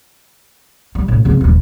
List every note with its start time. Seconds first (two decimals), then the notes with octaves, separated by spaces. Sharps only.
0.95 G3
1.08 F#2 A2
1.25 C#3 C4
1.41 D#1 E3